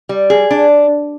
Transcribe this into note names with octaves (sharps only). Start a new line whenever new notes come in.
G3
G#4
D4